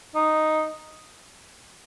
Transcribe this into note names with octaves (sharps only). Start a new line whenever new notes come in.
D#4